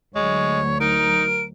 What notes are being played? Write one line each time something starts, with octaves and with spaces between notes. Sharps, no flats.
D2 F#3 G#3 C#5
D#4 A#4 D7